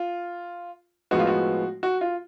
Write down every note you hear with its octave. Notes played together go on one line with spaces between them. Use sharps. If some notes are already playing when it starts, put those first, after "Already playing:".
Already playing: F4
A2 F3 G#3 B3 F#4
F4
F#4
F#4
F4